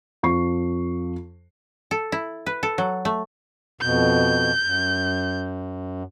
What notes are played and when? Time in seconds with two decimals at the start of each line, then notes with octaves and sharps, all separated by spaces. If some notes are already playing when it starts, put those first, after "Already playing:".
0.23 F2 C#6 C7
1.91 A4
2.12 E4
2.46 B4
2.63 A4
2.78 F#3
3.05 A3
3.81 F2 B2 G6
4.63 F#2